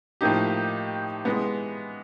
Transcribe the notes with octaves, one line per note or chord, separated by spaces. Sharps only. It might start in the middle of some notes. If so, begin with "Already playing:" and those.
A2 F3 A#3 D#4 G4
E3 G#3 B3